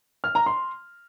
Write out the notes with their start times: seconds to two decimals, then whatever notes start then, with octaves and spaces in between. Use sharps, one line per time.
0.24 F6
0.35 A#5
0.46 C6